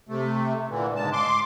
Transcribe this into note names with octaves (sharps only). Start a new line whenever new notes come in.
C3 A3
A#2 D3 E3
G#2 C#3 G#3 A5
C6 D6